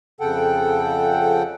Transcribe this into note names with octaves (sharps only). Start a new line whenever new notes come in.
F2 C#3 A4 F#5 G5